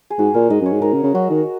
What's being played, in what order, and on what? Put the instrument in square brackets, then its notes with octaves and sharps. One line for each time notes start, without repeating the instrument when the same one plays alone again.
[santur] G#4
[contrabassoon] G#2 [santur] F#4
[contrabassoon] A#2 [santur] A#4
[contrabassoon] G#2 [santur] D#5
[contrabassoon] F#2
[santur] C#5
[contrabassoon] G#2
[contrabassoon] G#2 [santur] A#4
[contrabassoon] C#3
C#3
[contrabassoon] F#3 [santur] F#4
[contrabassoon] D#3